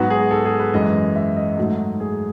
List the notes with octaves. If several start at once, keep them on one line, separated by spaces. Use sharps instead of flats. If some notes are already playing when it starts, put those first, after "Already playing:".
Already playing: G#2 F#3 B3 F#4
G#4
A4
G#4
B4
F#2 E3 G#3 D#5
E5
D#5
G#2 F#3 A3
G#4